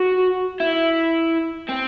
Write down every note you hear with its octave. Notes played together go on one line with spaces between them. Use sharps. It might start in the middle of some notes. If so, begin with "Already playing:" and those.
Already playing: F#4
E4
C4